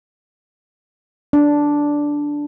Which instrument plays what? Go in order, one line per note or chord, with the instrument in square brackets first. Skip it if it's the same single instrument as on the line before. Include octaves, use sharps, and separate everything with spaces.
[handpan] D4